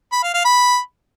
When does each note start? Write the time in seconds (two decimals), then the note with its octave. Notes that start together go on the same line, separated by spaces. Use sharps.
0.13 B5
0.23 F5
0.34 F5
0.45 B5